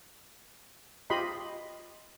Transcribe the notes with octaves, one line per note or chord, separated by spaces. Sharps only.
F4 G4 D#5 B5 C6